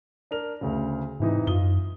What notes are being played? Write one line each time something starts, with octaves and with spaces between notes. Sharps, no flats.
D4 A#4 F7
D2 C#3
G#2 C3 E3 D#4
F#2 F4 D#6 G7